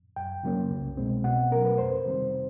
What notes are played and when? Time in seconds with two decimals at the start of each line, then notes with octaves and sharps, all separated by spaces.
0.16 F#2 G5
0.44 C#3 F#3 A#3 C#4
0.71 C2
0.97 B2 G#3 C4
1.24 B2 F#5
1.51 F#3 A3 C#4 A#4
1.65 B4
1.78 F2 C5
2.05 C3 D#3 G3 C4